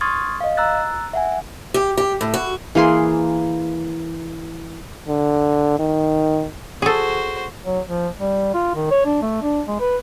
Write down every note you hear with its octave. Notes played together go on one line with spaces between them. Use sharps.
C6 C#6 D#6 F6 G#6 A6
D#5 F5
A#5 E6 F#6 A6
E5 F#5 G#5
G4
G4
A2
F#4
E3 A#3 G#4 C6
D3
D#3
F#4 G#4 A4 C5
F#3
F3
G3
F4
D#3
C#5
D4
A3
D4
G#3
B4